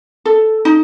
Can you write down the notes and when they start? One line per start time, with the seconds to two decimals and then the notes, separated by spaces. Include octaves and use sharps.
0.25 A4
0.65 D#4